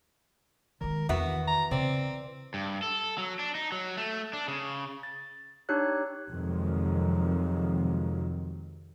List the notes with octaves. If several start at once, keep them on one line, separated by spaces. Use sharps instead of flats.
D#3 G#3 A#4
E2 D#3 E3 B3 F#4 B4
A#5
C#3 C4 D5
G2
A4
F#3
D4
D#4
F#3
A3
D4
C#3
A6
D4 D#4 G4 C#5 F#6
F2 C3 D#3 F3 F#3 G#3